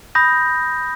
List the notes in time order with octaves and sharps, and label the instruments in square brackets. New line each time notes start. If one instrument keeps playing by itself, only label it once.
[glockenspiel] B5 D#6 G6 A#6